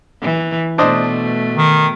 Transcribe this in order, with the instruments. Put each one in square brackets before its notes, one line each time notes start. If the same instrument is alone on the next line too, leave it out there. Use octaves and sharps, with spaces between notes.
[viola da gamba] E3
[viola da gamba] B2 A3 [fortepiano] D4 C5 D#5
[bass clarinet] D#3